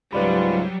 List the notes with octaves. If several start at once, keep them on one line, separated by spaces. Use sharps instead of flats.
C#2 G#2 F#3 G3 F4 B4 D5 B5